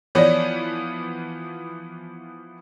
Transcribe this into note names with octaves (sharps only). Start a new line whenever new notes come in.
E3 F3 B3 C#5 D5